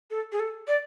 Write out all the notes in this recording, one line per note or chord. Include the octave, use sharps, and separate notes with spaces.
A4
G#4
A4
D5